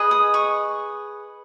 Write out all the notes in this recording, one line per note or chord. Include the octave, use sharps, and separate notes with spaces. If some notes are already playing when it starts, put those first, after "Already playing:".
Already playing: G#4 B4 D#5
D#6
C#6